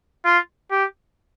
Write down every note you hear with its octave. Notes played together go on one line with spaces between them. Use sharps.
F4
G4